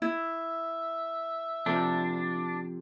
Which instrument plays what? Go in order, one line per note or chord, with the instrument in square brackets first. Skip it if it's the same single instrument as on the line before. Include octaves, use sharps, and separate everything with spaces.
[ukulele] E4 [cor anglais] E5
[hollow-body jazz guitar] C3 F3 A4 [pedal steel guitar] D4